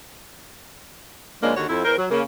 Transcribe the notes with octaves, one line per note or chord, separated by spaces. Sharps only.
C#3 F3 G#3 A#3 C#4 D4
D#2 D3 D#3 F#4 C#5
F2 E4
E2 A#4 C5
F#3
C#3 A#3